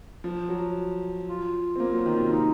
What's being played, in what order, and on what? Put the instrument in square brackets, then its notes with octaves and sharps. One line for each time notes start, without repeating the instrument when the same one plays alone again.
[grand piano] F3
F#3
[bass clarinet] F4
[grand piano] C4
A#3
F#3
D#3
C3
[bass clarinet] D#4